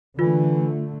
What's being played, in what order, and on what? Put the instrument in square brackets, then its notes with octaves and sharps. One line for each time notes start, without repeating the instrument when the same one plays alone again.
[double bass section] D3 A3 [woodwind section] E3 [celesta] F4